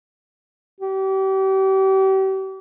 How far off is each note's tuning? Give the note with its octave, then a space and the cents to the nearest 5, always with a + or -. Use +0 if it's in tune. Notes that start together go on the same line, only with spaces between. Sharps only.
G4 -35